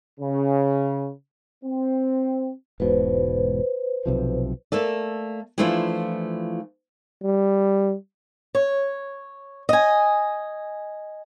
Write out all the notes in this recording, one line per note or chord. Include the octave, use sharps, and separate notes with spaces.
C#3
C4
E1 G#2 B2 B4 C5
B1 C3 F3
A3 A#3 A4 D5
E3 F3 A3 D4 E4 F4
G3
C#5
D#5 G#5